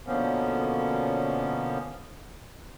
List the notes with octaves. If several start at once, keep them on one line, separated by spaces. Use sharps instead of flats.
B2 D3 F3 A#3 B3 C#4